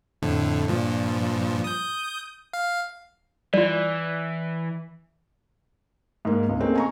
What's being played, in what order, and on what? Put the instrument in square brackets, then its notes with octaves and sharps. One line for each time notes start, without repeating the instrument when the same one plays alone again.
[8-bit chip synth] F2 A2 D3
G2 A#2 F3
D#6 G6
F5
[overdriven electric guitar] E3 [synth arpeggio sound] G3 F4 [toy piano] D5
[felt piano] G#2 A#3
G1 C#2
A3 A#3 C4 C#4 D#4 G#4
G#5 A#5 C#6